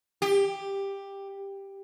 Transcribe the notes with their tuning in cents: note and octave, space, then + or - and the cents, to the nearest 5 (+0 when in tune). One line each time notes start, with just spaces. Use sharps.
G4 +10